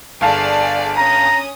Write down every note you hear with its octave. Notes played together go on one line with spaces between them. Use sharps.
G1 G#4 D5 F5 A5
C#4 A#5 D#6